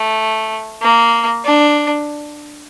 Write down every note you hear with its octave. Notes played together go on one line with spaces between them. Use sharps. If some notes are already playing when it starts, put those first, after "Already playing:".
Already playing: A3
A#3
D4